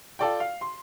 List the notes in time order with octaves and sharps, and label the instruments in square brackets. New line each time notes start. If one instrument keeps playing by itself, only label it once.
[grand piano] F4 A4 D5 G5
F5
C6